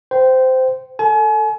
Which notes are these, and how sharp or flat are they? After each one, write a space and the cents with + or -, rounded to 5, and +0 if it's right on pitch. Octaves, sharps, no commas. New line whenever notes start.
C5 -15 G5 -20
A4 +15 G#5 +40